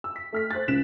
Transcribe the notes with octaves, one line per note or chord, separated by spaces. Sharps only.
E6
B6
A3 F6 B6
C5 F#6 A6
C#2 C#3 F#6 B6 E7